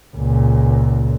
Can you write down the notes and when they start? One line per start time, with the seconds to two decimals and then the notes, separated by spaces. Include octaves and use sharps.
0.17 C#2 A#2